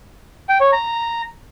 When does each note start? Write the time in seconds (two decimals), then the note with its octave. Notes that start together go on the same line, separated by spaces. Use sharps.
0.49 G5
0.61 C#5
0.72 A#5